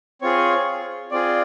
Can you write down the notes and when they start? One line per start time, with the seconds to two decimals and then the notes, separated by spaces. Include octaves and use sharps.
0.22 C4 F4 G#4 C#5
1.11 C4 F4 G#4 D5